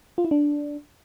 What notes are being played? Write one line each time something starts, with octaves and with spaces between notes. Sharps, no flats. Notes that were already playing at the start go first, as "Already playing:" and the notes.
F4
E4
D4